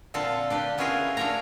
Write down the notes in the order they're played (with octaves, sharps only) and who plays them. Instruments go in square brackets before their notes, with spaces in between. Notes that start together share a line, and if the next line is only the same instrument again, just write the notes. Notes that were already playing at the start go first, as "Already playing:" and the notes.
[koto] A#2 D3 C4 F4 A4
D4 G4 B4
B3 C#4 E4 F4 G#4 A#4
D4 E4 F4 G4 C#5 A#5